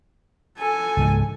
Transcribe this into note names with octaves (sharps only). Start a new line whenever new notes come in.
A4 G#5
C#2 G#2 E3